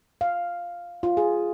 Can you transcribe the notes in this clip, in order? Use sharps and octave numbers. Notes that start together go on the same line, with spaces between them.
F5
F4
G#4